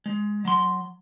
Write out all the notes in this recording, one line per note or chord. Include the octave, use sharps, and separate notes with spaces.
G#3
F#3 C6